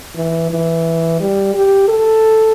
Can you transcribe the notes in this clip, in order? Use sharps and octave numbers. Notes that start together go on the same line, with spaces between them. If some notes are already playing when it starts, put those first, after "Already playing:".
E3
E3
G3
G4
A4